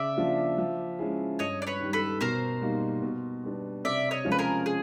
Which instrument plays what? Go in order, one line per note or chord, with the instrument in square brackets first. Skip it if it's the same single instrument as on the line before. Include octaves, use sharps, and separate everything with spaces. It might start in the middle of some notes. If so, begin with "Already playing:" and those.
Already playing: [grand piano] C#3 [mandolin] D5 E5
[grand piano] F3 A#3 D4 F4
F3
G#3 C#4 E4 G#4
[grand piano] G2 [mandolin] C#5 D#5
[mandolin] D5
B4 C#5
[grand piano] D#3 G3
[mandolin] A4 B4
[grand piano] B2 [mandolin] A#4 C5
[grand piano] G3 A#3 D#4
B2
G3 B3 D4
[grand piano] C3 [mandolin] D5 E5
[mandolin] C#5 D#5
[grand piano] F3 G#3 C#4 F4
[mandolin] B4
G#4 A#4
G#4